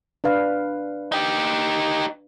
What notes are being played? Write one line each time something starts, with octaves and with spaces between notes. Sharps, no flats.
D4 B4 F5
D#4 G4